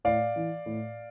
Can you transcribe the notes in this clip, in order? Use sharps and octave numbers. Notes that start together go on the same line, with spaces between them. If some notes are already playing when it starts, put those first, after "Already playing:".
A2 D5 F5
E3
A2